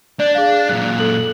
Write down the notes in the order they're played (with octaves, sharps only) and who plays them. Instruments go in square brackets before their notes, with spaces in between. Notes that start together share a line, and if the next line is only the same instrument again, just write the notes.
[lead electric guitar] D4 [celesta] D5
[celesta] G#4 F5
[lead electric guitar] F#2 A#2 [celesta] F#6
[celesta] A4 F#7